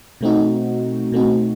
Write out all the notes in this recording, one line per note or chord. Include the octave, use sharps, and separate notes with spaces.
B2 A3 C4 D#4 F#4
B2 A3 C4 D#4 F#4